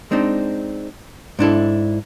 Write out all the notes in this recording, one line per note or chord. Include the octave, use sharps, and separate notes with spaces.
G#3 C4 D4 D#4
G#2 D4 E4 A4